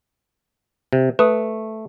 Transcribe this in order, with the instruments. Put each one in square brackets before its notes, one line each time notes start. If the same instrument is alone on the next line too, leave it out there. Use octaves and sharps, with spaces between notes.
[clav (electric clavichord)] C3
[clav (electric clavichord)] A3 [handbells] B4 D#6